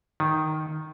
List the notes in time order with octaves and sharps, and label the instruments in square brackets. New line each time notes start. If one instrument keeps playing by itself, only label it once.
[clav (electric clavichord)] D#3